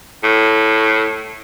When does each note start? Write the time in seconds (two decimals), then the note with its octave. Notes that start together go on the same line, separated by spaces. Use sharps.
0.23 A2